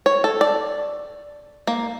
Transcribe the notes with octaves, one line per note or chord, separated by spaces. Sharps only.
C#5
A4
D5
A#3